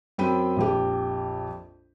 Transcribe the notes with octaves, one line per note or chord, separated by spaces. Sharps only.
F#2 C4 G5 B5 D#7
A#1 F2 G4